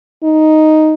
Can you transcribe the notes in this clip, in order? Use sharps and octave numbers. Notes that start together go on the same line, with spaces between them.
D#4